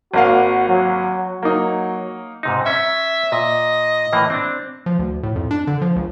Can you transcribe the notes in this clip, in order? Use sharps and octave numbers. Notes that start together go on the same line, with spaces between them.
G#1 A#3 F#4 F5
F#3
F#3 A#3 D#4
G#2 C3 D#4
C#4 E5
A#2 D#5
A2 E3 A#3
C4 D4
F3
D2
A2
F2
D4
D3
F3
C#2